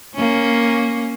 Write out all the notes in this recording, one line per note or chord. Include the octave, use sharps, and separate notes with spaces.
A#3 C#4